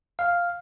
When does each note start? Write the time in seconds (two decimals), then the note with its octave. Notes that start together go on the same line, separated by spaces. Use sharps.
0.19 F5